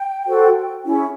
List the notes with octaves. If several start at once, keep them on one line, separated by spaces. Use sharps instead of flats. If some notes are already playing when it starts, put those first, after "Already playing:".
Already playing: G5
F#4 A4 C5
C#4 E4 G#4